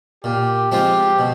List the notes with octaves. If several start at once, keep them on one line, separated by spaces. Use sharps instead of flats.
A#2 G4
F3 G#3 C4 F4 G4
B2